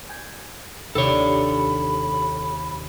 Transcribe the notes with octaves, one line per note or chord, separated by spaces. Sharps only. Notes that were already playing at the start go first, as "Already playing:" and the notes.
G#5 G6 G#6
D#2 C3 D4 A4 C#5 B5